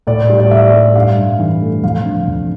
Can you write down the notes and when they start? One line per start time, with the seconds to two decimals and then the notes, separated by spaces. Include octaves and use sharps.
0.07 A2 D5
0.30 G3
0.40 D5
0.51 A2 E5
0.74 G3
0.95 G2 F5
1.17 G2
1.39 E3
1.61 A3
1.83 F2 F5
2.05 D3
2.27 F2